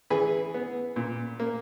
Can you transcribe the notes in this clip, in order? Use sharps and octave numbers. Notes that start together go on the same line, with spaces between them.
E3 G#4 B4
B3
A#2
A#3